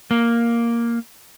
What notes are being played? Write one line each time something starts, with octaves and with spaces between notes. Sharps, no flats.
A#3